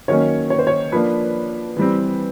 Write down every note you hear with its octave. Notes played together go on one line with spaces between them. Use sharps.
D#3 F#3 A#3 C#4 C#5
C#5
C5
C#5
F3 A#3 D4 B4
E3 G3 C4